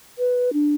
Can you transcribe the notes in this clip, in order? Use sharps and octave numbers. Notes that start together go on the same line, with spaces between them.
B4
D4